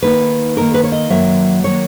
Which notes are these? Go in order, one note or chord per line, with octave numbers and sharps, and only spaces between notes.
D#3 A#3 D#4 B4
D#3 A#3 D#4 A#4
B4
C#5
D#5
F#2 D#3 F#3 A#3 E5
D#3 F#3 A#3 C#5